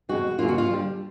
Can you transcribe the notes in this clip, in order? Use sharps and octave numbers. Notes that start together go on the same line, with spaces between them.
E2 B2 G#3 C4 F#4
E2 C#3 F#3 A#3 F4
F#4
F4
D2 D3 G3